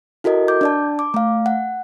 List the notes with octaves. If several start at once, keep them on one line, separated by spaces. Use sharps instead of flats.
E4 F#4 A4 A#4 D#5
D6 G6
D4 D5 A5
D6
A3 F5
F#5